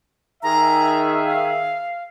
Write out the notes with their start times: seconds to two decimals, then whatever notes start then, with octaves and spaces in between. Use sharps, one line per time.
0.43 D#3 G#4 E5 A#5
1.25 F5